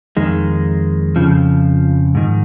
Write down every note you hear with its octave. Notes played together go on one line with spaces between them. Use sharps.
F2 D#3 G#3
F2 C#3 F3
G#2 D#3